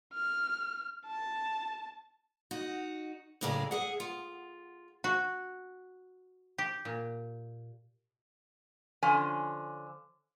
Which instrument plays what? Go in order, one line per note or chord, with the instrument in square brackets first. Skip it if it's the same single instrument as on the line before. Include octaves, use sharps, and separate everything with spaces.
[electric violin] F6
A5
[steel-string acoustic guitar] D#4 F#4
F#2 A2 C#3 G#4 D5 A#5
G#4 E5 F#5
F4
[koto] F#4
G4
A#2
[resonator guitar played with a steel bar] D3 F3 C#4 G#5